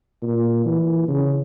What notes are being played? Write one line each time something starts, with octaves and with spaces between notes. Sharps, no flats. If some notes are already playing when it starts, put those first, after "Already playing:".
A#2
E3
C#3